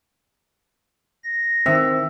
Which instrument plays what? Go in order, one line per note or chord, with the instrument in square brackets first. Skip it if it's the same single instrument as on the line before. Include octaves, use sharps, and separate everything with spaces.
[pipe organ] A#6
[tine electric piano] D#3 C4 [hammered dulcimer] E5